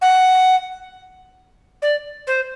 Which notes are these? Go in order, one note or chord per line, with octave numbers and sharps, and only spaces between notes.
F#5
D5
C5